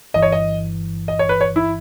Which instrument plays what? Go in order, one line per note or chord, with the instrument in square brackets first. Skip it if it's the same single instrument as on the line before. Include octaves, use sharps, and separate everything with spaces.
[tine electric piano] G1 G2 E3 [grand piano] D#5
[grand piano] C#5
D#5
D#5
C#5
B4
C#5
E4